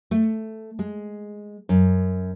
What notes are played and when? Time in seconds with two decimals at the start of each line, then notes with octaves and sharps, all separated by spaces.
0.11 A3
0.79 G#3
1.69 F#2